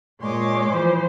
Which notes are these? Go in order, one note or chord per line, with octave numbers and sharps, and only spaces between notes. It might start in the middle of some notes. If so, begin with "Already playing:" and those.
A#2 G#3 C#5 C6 D6
E3 F3 C5